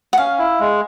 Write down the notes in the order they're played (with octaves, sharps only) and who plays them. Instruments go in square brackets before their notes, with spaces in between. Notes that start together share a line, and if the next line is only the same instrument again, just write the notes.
[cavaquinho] F#5
[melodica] C#4 [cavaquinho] F5
[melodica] E4
G#3